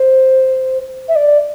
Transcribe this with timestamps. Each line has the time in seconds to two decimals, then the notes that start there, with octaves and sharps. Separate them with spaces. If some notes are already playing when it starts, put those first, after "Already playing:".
Already playing: C5
1.08 E5
1.15 D5